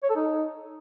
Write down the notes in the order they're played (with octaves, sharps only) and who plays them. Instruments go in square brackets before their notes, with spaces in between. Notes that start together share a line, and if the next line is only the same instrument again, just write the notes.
[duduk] C#5
A4
D#4